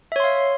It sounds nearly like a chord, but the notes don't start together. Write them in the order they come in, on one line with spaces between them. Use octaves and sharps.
E5 C#5 C6 F5